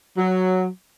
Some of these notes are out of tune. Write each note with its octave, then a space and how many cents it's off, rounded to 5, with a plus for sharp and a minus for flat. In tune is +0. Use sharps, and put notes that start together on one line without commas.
F#3 +0